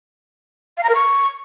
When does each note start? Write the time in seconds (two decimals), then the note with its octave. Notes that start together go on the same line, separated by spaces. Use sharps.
0.77 F5
0.83 A#5
0.89 A#4
0.95 C#6